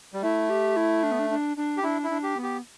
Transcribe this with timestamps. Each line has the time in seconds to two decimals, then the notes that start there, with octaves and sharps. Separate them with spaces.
0.14 G3
0.22 A3 E4
0.50 G4
0.76 E4
1.03 D4
1.12 B3
1.19 D4
1.30 D4
1.57 D4
1.77 G4
1.83 D4 E4
2.04 E4
2.10 D4
2.23 G4
2.37 B3
2.43 G4